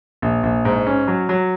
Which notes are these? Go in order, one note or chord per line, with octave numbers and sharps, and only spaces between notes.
A#1
A#1
G#2
C#4
F#3
F#3